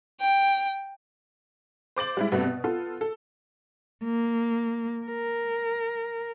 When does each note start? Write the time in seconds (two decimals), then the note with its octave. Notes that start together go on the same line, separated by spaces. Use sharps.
0.21 G5
1.96 C5 D6 A6 F#7
2.17 G3 G#3 E4
2.32 G2 C3 A3 B3 F#4
2.44 B2
2.64 B3 F4 A4
3.01 A4
4.03 A#3
5.06 A#4